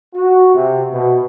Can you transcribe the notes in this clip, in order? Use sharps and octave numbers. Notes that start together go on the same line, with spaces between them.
F#4
C3
B2